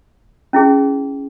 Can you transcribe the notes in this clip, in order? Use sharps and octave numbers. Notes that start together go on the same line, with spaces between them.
C#4 E4 G#4